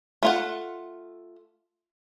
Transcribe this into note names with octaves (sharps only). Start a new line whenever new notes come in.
A3 F4 F#5